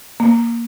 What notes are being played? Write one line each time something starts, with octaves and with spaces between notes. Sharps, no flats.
A#3